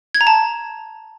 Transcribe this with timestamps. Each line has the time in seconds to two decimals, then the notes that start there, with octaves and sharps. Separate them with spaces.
0.15 G#6
0.21 A#5
0.27 A5